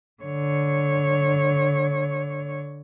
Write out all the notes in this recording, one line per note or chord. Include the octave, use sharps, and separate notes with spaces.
D3 C#5